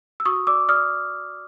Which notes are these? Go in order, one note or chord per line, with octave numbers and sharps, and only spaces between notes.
E6
F#4 C#6 D#6
D5 D6 E6
D5 D#6 F6